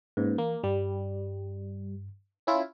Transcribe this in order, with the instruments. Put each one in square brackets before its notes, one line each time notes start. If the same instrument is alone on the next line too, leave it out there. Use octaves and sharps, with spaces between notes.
[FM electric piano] G#2 [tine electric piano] A#3 C#4 B4
[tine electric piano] E3 [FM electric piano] A#3
[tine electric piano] G2 [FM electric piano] G3
[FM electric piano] C#4 E4 F4